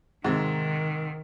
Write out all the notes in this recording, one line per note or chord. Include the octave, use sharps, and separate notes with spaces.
G#2 C3 D#3